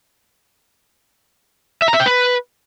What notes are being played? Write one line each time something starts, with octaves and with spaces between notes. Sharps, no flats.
E5
A#5
E5
G5
B4